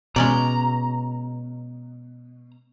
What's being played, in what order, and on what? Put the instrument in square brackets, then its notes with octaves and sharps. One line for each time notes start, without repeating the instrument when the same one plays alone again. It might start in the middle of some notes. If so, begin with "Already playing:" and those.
[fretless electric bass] B2 [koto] G#3 C#4 D5 [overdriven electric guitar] A#5